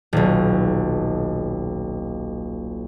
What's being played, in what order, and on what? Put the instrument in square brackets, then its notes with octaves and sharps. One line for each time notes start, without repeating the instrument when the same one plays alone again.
[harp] D#1 B1